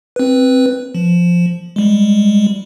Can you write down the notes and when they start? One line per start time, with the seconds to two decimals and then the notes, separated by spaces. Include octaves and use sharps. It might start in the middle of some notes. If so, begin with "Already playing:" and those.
0.16 C4 B4
0.95 F3
1.76 G3 G#3